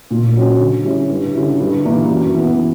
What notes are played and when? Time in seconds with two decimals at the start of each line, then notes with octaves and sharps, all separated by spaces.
0.11 A#2
0.35 F#3 C#4
0.59 D3
0.85 G3 C#4 E4
1.10 G2
1.34 D3 G3 C#4 E4
1.60 G2
1.85 E3 A#3 D4
2.10 F#2
2.35 E3 B3